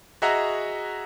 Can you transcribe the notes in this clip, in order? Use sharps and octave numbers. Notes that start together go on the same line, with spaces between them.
F#4 G#4 D#5 E5 F#5 A#5